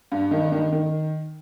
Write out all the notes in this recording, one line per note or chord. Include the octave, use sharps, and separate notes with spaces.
G2
D#3
D#3
D#3